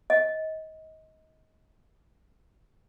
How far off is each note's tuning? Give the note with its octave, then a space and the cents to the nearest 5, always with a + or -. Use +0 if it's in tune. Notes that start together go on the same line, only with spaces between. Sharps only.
D#5 +25